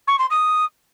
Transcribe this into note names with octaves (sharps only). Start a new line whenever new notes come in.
C#6
C6
D#6